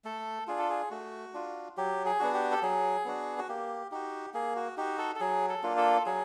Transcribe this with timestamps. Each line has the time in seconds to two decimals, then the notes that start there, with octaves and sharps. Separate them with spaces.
0.04 A3 A4
0.47 D4 F4 G#4
0.59 A4
0.70 G#4
0.91 A3 F#4
1.34 D4 F4
1.77 F#3 G4
2.05 G#4
2.19 B3 D4 F#4
2.34 G4
2.52 A4
2.62 F#3 G#4
3.05 B3 D4 F#4
3.39 F#4
3.49 A#3 G4
3.91 D#4 F#4 G4
4.34 A#3 G#4
4.56 F#4
4.77 D#4 F#4 G4
4.98 A4
5.16 A4
5.20 F#3 G#4
5.49 A4
5.63 A#3 D4 F4
5.77 A4
6.06 F#3 G#4